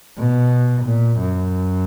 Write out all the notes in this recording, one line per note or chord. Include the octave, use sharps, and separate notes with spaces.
B2
A#2
F#2